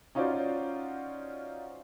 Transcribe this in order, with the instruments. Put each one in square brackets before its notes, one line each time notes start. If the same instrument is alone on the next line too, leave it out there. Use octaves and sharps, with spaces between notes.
[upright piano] C#4 D#4 F4 F#4 C5 D5